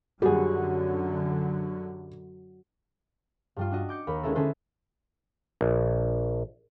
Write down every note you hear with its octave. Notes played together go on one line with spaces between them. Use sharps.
F#2 D3 F#3 G3 F#4 G#4
G2 G3 F4
D4 F#4 D#5
D6 G6 C#7
D#2 A#4 B5
G#3 C#4 D#4 E4 A4
D3 C#4 A4 B4 C5
A#1